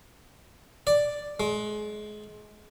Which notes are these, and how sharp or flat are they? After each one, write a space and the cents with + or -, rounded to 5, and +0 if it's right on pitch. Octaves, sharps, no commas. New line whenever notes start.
D5 +0
G#3 +25